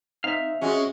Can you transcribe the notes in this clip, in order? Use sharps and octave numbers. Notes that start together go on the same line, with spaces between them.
C4 D#4 E5 F5
G#3 C4 C#4 F4 F#4